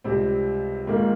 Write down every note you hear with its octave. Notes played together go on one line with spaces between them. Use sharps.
C#2 C3 G3 C4
G#2 D#3 A#3 F4